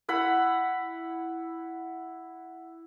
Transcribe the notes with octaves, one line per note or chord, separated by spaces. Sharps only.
E4 F#5 B5